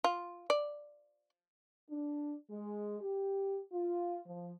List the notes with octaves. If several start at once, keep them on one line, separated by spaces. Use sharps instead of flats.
F4
D5
D4
G#3
G4
F4
F3